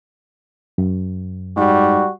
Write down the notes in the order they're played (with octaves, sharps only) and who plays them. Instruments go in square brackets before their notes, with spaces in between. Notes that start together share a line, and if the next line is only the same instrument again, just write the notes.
[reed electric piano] F#2
[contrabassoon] G#2 [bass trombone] G3 [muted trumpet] F#4